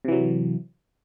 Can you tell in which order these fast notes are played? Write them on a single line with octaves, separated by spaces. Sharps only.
C3 E3 F#3